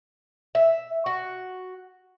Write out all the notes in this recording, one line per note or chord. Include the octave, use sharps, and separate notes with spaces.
E5
F#4